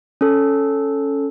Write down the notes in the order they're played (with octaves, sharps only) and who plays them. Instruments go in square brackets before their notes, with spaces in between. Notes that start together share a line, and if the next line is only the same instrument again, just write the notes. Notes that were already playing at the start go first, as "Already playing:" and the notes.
[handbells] C#4 A4